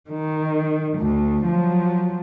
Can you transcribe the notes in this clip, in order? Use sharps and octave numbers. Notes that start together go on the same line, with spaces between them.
D#3
D2
F3 F#3